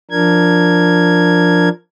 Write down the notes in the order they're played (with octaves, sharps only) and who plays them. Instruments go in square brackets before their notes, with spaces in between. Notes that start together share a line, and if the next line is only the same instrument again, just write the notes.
[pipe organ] F3 D4 A#4 G#6